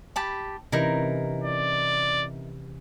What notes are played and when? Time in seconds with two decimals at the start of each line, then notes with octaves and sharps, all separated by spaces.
0.16 G4 A5 B5
0.72 C3 E3 C#4 D#4 E4 A#4
1.44 D5